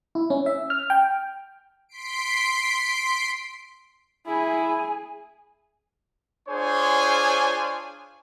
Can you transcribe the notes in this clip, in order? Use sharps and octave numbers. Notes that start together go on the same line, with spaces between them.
E4
C#4
E5
F6
G5
C6 B6 C7 D7
E4 G#4 G#5
D4 F4 G#4 C5 C#5 G#5